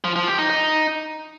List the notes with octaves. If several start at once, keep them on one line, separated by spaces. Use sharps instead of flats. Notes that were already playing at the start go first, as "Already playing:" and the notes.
F3
F3
G4
D#4
D#4